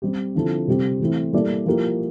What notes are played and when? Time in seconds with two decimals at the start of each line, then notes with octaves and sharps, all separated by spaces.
0.02 G3 C4 G4
0.35 D3 F3 C4 E4 A4
0.67 C3 G3 C4 G4
1.00 E3 A3 C4 E4
1.33 G3 A#3 E4 A4 D5
1.66 F3 A#3 E4 G4 A#4